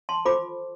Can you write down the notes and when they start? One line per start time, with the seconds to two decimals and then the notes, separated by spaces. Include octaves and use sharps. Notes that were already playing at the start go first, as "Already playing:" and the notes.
0.09 A5 C6
0.25 F4 A4 C5 B5 D6